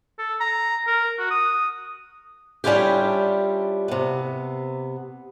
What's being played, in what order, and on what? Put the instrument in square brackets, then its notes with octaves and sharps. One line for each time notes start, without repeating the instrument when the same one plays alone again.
[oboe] A4
A#5
A#4
F#4
D#6
[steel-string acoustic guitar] G3 C#4 D4 E4 F4 G4
C3 B3